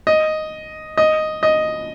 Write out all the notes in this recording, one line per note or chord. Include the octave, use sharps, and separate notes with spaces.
D#5
D#5
D#5